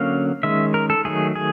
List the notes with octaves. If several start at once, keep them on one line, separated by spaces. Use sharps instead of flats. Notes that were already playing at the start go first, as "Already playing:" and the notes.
Already playing: D3 F#3 A#3 C#4 F5
D#3 G#3 C#4 E5
A#4
A4
D#3 F#3 A3 G#4
G#4